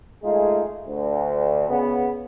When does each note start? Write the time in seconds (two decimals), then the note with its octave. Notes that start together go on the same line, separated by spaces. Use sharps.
0.23 G#3 A3 D#4 F4 G#4
0.86 D2
1.69 C#3 B3